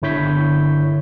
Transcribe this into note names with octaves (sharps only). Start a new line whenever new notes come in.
G1 D3 E4 C#5 G6 B6